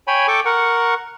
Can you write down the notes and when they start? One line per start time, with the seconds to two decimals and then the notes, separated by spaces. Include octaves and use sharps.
0.07 C#5 G5 G#5 B5
0.28 A4 G5 C#6 D6
0.45 A#4 F#5 C#6